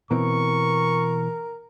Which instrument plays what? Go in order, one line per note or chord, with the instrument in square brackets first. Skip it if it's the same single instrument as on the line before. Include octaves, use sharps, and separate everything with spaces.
[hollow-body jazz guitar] B2 E3 C4 [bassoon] A#4 [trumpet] C#6